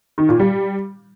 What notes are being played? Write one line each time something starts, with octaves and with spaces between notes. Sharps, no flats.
D#3
A#2
G3